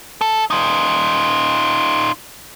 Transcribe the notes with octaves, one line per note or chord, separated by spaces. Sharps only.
A4
D#4 F4